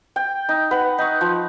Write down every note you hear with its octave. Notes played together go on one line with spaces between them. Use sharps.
G5
D#4
B4 F#5
D#4 C#6
F3